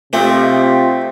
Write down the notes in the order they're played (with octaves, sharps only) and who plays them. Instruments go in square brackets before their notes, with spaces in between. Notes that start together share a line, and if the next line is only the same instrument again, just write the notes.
[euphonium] C3 [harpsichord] A3 C4 [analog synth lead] F4 [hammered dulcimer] G4 D#5